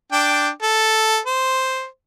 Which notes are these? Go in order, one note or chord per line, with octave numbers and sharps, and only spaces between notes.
D4 G5 D6
A4
C5